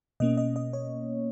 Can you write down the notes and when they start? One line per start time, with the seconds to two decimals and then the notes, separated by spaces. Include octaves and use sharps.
0.20 B2 A#3 C#4 D#5
0.37 D#5
0.56 D#5
0.73 C#5